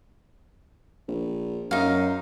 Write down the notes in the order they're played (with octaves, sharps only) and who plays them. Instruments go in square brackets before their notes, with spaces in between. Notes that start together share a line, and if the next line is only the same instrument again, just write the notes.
[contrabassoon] A#1
[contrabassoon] F#2 [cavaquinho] D#4 F5